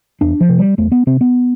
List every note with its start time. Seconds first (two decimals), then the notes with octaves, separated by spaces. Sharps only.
0.21 E2 D4
0.41 F3
0.49 C3
0.59 G3
0.78 E2 A3
0.92 B3
1.07 C3 C4
1.21 B3